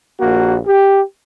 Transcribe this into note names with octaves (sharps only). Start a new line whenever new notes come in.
A#1 A#3 F#4
G4